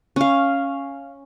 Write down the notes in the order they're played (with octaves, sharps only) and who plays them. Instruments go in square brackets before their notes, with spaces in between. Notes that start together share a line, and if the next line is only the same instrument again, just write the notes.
[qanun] C#4 F5